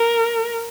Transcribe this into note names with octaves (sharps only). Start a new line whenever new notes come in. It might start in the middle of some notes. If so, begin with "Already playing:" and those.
Already playing: A#4